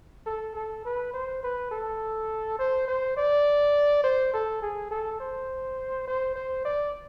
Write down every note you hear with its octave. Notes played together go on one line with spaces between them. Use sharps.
A4
A4
B4
C5
B4
A4
C5
C5
D5
C5
A4
G#4
A4
C5
C5
C5
D5